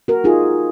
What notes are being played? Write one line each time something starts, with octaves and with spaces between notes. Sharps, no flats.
F#4 A#4
D#4 F4 G#4